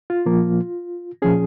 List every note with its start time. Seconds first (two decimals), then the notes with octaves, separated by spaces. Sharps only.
0.10 F4
0.26 A#2 F3 A#3
1.22 A#2 F3 C#4 G#4